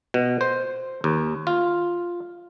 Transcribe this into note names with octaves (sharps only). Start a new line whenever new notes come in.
B2
C5
D#2
F4